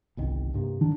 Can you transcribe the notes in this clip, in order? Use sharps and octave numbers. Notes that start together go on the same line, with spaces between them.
G1 C2 D#3
G2 C3 A#3
D#3 D4